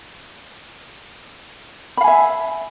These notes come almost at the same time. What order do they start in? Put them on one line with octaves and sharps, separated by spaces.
B5 F5 G#5 E5